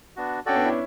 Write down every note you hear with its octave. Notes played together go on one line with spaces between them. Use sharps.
B3 D4 F#4
C#4 F#4 A4 D5 G5
B3 D4
C#4 E4